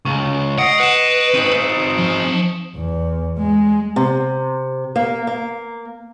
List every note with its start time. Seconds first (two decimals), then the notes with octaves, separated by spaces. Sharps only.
0.05 C#2 C#6
0.58 D#5 F#5 D#6 C7 D7
0.80 B4 C#7 E7
1.34 C4 D#4
1.98 F3
2.76 E2
3.38 G#3
3.96 C3
4.96 A#3
5.27 A#3